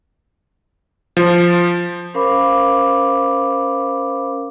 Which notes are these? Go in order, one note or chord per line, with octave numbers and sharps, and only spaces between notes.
F3
C#4 A#4 C5 F5 B5 D6